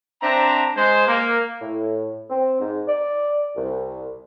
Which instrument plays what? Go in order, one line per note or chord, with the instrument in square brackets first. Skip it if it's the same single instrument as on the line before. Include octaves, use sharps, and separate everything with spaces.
[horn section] C4 D4 C5 E5 A#5
G#3 C5
A#3
[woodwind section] A2
C4
G#2
D5
C2